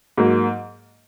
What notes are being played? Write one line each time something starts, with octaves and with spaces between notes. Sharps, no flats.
G#2 F#3 A#3